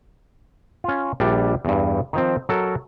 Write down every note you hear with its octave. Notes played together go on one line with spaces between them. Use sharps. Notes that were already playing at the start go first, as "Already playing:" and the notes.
C#4 F4
A#1 G3 D4 D5
E2 G2
D#3 F3 C4
F#3 A4 A#4